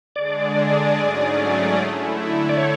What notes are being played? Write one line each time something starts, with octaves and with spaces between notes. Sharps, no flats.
D3 G#3 D4 G#4 D5
G#2 F#3 A3 C#4 G#4
D3 A3 E4
D5
C#5